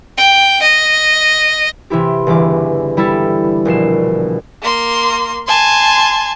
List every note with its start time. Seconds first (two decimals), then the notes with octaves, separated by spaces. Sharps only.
0.18 G5
0.62 D#5
1.90 C3 E3 E4 G4
2.27 G1 C#3 E3 D6
2.97 G3 E4 G4 A4
3.65 A#1 B2 C7 E7
4.62 A#3 C6
5.47 G#5 A5 C6